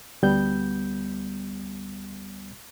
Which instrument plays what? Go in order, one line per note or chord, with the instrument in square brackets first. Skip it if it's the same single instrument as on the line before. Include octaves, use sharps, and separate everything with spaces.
[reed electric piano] D2 G3 B3 G6